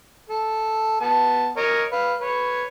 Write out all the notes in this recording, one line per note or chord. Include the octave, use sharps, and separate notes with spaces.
A4
B3 A5
A#4 C#5 D#5
B4 F5
B4 C#5